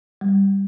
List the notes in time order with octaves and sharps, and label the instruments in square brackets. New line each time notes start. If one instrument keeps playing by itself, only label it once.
[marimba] G3